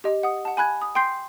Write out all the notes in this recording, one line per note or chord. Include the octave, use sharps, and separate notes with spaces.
G4 D#5
F#5 D#6
F#5 A5
G#5 B5 F#6 G#6
D#6
G5 C6 G6 C7